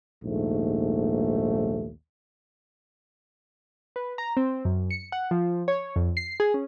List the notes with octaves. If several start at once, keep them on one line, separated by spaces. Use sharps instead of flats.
A#1 D#2 G#2 A3
B4
A#5
C4
F#2
C#7
F#5
F3
C#5
F2
C7
G#4
C#4